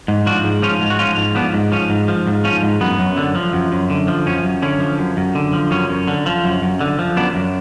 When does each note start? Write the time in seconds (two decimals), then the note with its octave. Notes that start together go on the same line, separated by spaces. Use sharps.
0.08 G#2
0.26 F3 D4 F#4
0.44 G#2
0.62 F3 C#4 F4
0.81 G#2
0.90 F#4
0.99 F3 C#4 F4
1.17 G#2
1.35 F3 B3 D4
1.54 G#2
1.72 F3 C#4
1.90 G#2
2.08 F3
2.27 G#2
2.44 F3 C#4
2.63 G#2
2.81 F#2 B3
2.99 F#2
3.17 D3
3.35 F3
3.53 F#2
3.72 F#2
3.90 D3
4.08 F3
4.26 F#2 C#4
4.44 F#2
4.62 D3 C#4
4.80 F3
4.99 F#2
5.17 F#2
5.35 D3
5.53 F3
5.71 F#2 C#4
5.89 F#2
6.08 D3
6.26 F3
6.44 F#2
6.62 F#2
6.81 D3
6.99 F3
7.16 F#2 B3 D4
7.35 F#2